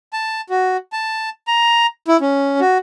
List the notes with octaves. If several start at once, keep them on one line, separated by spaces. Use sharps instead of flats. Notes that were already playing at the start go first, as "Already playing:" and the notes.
A5
F#4
A5
A#5
E4
C#4
F#4